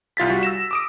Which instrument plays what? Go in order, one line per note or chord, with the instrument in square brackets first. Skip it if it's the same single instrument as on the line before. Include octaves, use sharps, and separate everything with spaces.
[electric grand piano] C2 F4 A6 B6
G3 F#4
E6 A#6 E7
D6 D#6 D7